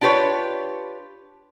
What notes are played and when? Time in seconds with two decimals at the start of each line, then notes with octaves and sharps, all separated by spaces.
0.01 D4 F4 G4 B4 C#5